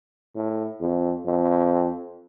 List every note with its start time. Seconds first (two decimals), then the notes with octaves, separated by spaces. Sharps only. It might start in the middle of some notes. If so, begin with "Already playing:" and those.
0.35 A2
0.81 F2
1.26 F2